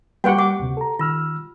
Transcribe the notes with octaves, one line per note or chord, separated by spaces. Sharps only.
G3 A#3 F#4 G4 B4 F#5 G5 C#6
F#5 D6
D2 C3
A4 A#5
D#3 F4 E6 F6